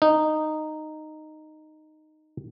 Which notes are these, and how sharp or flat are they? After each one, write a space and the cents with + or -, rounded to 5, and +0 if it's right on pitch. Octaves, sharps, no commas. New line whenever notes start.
D#4 -10